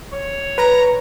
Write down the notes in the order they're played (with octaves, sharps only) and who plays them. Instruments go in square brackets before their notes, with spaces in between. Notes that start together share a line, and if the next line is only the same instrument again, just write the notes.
[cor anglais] C#5
[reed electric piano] B4 [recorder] A#5